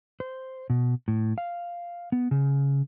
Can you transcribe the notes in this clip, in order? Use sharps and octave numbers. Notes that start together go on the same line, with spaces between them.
C5
B2
A2
F5
B3
C#3